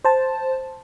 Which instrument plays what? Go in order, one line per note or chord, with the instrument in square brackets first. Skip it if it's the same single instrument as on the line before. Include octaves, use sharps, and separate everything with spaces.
[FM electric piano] C5 A5